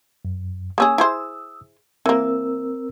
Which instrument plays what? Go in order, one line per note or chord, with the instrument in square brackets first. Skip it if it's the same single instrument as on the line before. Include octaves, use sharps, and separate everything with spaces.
[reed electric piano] F#2
[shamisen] A#3 C#4 G#4 [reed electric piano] D#6 E6
[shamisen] E4 G#4 C5
[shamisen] E3 A#3 [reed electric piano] C4 A#4 E6